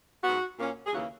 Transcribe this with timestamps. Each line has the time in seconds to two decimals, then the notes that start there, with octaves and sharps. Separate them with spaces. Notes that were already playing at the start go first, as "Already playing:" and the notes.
0.23 G#2 F#3 B3 F#4
0.58 A#2 A#3 C#4
0.86 G#4
0.93 D#2 C#3 E3 A#3 F#4